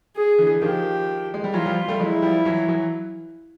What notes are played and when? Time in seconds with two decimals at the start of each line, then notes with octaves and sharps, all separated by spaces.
0.16 G#4
0.38 D3 E3
0.62 D#3 F3 G4
1.34 G#3
1.44 G3
1.54 E3 F#3 F4
1.66 F3 G3
1.88 G3 A3
2.00 F#3 G#3 E4
2.22 F3 G3
2.45 E3 F#3
2.68 E3 F#3